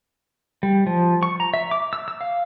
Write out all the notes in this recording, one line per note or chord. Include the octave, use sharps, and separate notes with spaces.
G3
F3
C#6
A#5
E5
D6
E6
E6
F5